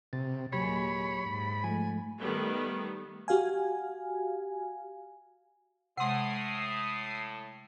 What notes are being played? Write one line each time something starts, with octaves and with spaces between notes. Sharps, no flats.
C3 A6
D#2 A#2 F#3 G#3 G4 C#5 B5 G#6
G#2
F3 G#3 A3 G#5
D#3 G3 A3 B3
F#4 G4 F5 G#5
A2 C3 G#3 F#5 C6 D#6 C7